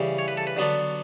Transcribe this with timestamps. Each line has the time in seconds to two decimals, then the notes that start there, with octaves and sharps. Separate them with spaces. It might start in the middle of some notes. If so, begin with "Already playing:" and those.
Already playing: C#3 E3 G3
0.19 C#5
0.28 B4
0.37 A4
0.47 B4
0.56 D3 F#3 B3 D4